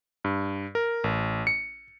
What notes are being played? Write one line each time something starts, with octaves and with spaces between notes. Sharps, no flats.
G2
A#4
A1
C#7